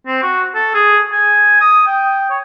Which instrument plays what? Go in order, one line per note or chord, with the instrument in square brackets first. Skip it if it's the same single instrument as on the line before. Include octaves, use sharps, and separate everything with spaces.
[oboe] C4
F#4
A4
G#4
G#5
D#6
G5
C#5